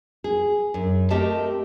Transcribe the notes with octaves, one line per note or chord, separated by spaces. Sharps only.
G#4
F#2
A3 C4 G4 A#4 D#5 A5